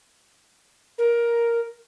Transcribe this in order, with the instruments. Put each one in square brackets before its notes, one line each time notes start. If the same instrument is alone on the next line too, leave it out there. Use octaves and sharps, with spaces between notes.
[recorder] A#4